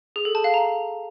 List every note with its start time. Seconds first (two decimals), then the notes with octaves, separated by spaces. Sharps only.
0.16 G#4
0.25 A4
0.35 A5
0.44 F5
0.54 A#5